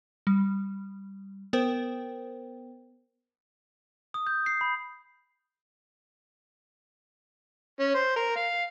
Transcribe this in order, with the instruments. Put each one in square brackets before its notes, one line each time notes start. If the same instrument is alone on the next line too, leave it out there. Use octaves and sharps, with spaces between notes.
[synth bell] G3
B3 A#4 C5 G5
[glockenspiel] D#6
G6
C7
B5
[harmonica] C#4
C5
A#4
F5